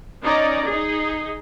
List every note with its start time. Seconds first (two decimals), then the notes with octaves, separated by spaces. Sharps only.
0.23 C#4 D#4 D5 D#5 A#5
0.66 D#4 G#4